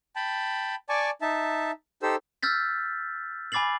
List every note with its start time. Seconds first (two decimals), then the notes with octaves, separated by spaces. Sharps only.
0.16 G5 A5 B5
0.89 D5 G#5 A5 C#6 D6
1.22 D#4 E5 A5
2.02 D#4 G4 A4 C5 E6
2.43 E6 F6 G6 A6 B6
3.52 G#5 B5 D6 A6 C7 F#7